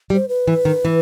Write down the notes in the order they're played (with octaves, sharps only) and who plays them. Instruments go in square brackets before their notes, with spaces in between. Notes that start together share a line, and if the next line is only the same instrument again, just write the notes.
[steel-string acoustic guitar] G3
[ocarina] C5
B4
[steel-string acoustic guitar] E3
D#3
E3